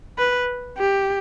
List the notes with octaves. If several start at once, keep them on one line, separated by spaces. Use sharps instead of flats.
B4
G4